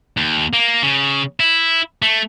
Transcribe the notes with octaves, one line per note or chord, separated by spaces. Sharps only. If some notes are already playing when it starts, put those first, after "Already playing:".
D#2
A#3
C#3
E4
A3